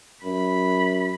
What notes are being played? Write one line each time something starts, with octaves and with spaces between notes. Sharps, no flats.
F#2 B5